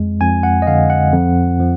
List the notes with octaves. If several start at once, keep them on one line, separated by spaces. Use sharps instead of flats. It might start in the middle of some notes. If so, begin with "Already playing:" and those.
Already playing: F2 G#3
F2 G#5
F#5
D#5
D3 F5
F#5
F2
F3